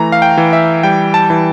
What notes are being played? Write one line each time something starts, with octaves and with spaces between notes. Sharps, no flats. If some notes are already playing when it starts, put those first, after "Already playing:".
Already playing: E3 A3 A#5
F5
G5
E3
E5
G3 G5
A5
E3